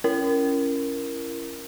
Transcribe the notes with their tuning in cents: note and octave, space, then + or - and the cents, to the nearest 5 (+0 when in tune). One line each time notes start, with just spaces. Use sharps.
C#4 +0 E4 +30 A#4 +0